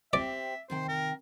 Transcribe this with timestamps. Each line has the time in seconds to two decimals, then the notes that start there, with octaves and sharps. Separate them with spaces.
0.13 C4 G4 D5 E5
0.70 C3 D#3 C5 G5
0.89 A#4